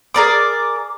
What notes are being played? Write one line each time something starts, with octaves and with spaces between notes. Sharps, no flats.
G#4 A#4 D5 D6